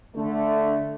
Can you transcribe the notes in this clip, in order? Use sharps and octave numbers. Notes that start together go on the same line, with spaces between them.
D3 A3